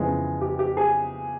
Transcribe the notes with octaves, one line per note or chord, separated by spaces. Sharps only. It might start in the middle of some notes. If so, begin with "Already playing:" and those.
Already playing: F2 C#3 E3 G#3 B3
G4
G4
G#4